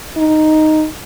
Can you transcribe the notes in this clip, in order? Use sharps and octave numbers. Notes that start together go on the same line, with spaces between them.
D#4